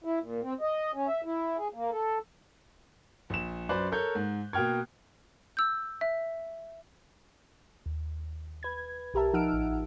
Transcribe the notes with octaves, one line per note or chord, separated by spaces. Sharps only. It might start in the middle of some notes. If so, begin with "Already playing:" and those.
E4
A#2
C4
D#5
C#4
E5
E4
G#4
A#3
A4
A#1 E7
F#2 B4 C5 D5 F#6
A4 A#4 C#5 G6
G#2
B2 A#3 G5 F6 G#6
E6 G6
E5
D#2
B4 G#6
B1 G4 A#4 E5 A5
F3 D#4 F#5 E6 F6 D7
A1